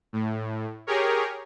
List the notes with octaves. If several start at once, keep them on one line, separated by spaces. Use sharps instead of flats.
A2
G4 G#4 A#4 C#5